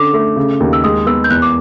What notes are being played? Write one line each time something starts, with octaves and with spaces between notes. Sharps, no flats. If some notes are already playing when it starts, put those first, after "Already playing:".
Already playing: D3 C#4 D6
A3
C#3
D#2
E6
G#3 D#6
B3 E6
G6
E2 F#6
D6